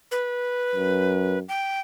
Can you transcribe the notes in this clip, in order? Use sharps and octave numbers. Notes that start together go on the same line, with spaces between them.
B4
F#2
G5